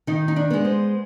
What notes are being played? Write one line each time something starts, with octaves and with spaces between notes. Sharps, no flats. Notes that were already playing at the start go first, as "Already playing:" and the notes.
D#3 D#4
D#4
D4
G#3 B3
C5